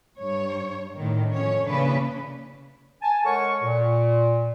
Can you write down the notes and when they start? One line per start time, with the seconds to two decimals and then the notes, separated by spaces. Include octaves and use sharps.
0.18 G2 C#5
0.98 A2 D3 D#3
1.32 F2 C#4 C#5
1.67 C#3 E3 A#3 D4 B4
3.02 G#5 A5
3.25 G#3 A4 A#4 C#5 F#5 C#6
3.63 A#2